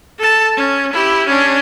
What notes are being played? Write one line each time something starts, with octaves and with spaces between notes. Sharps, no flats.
A4 A5
C#4
E4 G4
C#4 D4